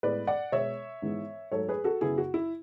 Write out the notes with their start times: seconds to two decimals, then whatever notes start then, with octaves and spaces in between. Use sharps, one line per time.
0.03 A2 G#3 B3 B4 D5
0.27 D5 F#5
0.52 B2 G#3 B3 C#5 E5
1.02 G#2 E3 G#3 B3
1.52 G#2 F#3 A3 A4 C#5
1.69 G#4 B4
1.84 F#4 A4
2.01 F#2 C#3 F#3 B3 E4 G#4
2.18 F#4
2.34 E4